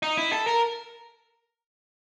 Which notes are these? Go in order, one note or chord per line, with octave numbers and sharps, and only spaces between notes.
D#4
E4
A4
A#4